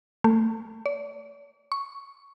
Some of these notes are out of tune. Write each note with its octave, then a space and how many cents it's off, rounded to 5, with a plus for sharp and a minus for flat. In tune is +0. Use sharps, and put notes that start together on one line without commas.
A3 +25
D5 -45
C#6 +5